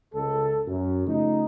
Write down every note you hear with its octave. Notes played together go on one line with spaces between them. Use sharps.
C#2 A4
F#2
C#3 F3 A3 D#4